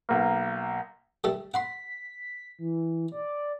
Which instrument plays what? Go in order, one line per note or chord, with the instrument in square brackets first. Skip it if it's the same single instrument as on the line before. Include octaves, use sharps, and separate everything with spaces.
[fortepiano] B1 A#3
[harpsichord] G3 A3 A4
[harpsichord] F#5 B5 C6 [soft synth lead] B6
[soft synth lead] E3
D5